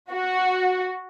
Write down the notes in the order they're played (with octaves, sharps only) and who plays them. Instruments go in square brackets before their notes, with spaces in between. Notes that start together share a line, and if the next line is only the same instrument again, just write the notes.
[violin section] F#4